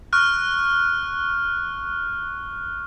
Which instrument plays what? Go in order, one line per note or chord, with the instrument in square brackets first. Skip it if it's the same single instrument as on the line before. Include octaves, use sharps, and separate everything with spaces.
[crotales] C#6 F6 F#6